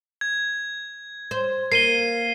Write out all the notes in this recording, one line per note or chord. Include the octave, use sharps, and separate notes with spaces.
G#6
C5
A#3 C7 D#7 G7